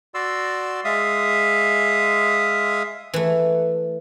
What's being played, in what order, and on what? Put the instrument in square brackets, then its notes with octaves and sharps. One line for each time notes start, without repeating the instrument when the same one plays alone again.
[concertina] F#4 D5 C6 E6
G#3 E5 F5 D#6
[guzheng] E3 A3